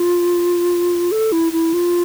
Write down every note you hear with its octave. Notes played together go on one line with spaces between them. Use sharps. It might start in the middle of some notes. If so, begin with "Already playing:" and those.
Already playing: F4
A4
E4
E4
F4